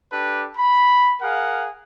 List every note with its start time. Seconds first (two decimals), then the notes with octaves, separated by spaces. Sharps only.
0.12 D4 G4 A4 B4
0.57 B5
1.22 G#4 A#4 F5 F#5